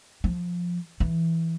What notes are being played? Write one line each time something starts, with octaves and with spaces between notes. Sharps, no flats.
F3
E3